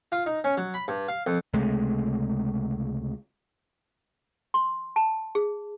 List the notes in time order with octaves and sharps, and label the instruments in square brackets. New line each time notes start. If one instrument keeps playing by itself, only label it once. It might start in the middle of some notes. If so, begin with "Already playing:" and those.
[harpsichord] F4
D#4
C#4
F#3
B5
G2
F5
F2
[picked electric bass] C#2 C3 G#3 A3
[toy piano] C6
A5
G#4